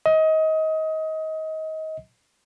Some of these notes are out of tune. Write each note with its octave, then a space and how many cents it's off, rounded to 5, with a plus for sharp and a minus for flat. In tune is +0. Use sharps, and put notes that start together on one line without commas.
D#5 +25